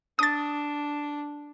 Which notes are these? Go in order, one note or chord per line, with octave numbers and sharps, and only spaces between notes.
D4 D#6 A6